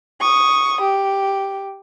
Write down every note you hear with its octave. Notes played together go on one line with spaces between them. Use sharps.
C#6 D#6
G4